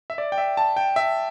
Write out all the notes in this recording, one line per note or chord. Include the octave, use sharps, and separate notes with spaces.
E5
D5
G5
E5
A5
G5
E5